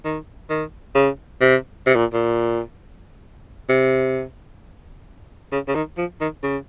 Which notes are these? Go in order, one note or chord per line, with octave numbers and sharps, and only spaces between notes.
D#3
D#3
C#3
C3
C3
A#2
A#2
C3
C#3
C#3
D#3
F3
D#3
C#3